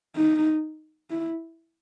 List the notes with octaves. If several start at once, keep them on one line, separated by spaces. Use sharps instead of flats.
D#4
E4